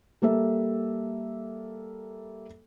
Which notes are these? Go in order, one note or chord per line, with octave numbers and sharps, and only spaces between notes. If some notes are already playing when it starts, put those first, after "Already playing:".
G3 A#3 A4 E5